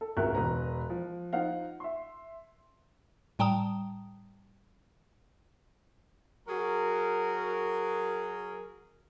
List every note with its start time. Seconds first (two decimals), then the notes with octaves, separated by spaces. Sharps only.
0.01 A4
0.17 G#1 C#2 F#4 A#4 E5 F#6
0.35 E1 B4 A#5
0.90 F3
1.33 D#4 F4 C5 F5 F#5
1.80 E5 C6
3.39 A2 G3 G5 A5 A#5 D#6
6.48 F#3 F#4 G#4 A#4